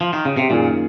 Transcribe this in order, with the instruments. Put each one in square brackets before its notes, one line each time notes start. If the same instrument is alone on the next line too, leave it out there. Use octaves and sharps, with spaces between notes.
[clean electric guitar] F3
D#3
C#3
C3
[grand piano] F#2 D#3 A#3 F4 G#4 [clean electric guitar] A#2